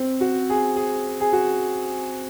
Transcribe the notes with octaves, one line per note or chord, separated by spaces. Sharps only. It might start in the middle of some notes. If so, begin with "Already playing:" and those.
Already playing: C4
F#4
G#4
G#4
G#4
F#4